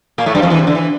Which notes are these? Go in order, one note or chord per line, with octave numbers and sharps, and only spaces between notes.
A#2 A#3
A2 A3
G2 G3
F2 F3
E2 E3
C3
D3
E3